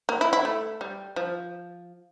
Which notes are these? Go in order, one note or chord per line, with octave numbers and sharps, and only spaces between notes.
A#3
E4
E4
A3
G3
F3